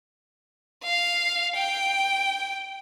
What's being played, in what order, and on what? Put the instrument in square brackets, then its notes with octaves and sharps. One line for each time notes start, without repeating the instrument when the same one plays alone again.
[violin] F5
G5